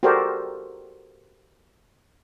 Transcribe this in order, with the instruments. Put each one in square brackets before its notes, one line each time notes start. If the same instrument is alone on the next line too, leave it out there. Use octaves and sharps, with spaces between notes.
[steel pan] F#4 G4 A4 A#4 C5 D5